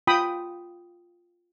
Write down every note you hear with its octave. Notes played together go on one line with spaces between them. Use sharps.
F4 G5 B5 D#6